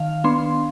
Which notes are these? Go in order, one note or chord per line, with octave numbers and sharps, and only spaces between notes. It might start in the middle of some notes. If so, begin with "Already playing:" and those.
Already playing: D#3 F5
B3 D4 C6